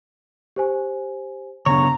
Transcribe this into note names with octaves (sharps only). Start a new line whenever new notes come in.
G4 C5 G#5
C#3 B3 D4 C#5 A#5